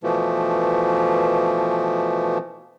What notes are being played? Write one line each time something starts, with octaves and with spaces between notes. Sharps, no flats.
B2 E3 F3 A3